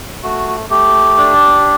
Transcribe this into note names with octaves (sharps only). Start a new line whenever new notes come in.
A3 F#4
A3 G4
D4